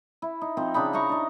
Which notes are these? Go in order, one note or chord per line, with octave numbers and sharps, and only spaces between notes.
E4
D#4
F3 C4 D#4
C#3 D4 D#4 B5
D#4 E4 A#5 C#6
D4 D#4